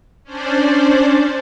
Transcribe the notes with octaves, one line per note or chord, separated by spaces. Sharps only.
C#4 D4 C5 D5